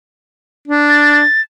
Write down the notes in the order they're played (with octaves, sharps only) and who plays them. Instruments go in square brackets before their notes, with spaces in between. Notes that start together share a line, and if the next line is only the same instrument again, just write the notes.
[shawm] D4
[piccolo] A6